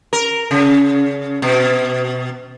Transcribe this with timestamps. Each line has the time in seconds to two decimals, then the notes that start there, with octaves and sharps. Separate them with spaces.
0.13 A#4
0.51 C#3
1.42 B2